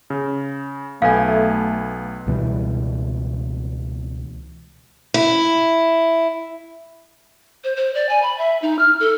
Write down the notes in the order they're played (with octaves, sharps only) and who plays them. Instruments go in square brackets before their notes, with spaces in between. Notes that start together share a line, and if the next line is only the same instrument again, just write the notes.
[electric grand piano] C#3
[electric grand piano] B1 B3 G#5 [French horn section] A3 [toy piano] F5
[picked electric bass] C#2 B2 E3 G3
[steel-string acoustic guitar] E4
[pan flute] C5
C5
D5
G#5
B5
E5
D#4
F6
A4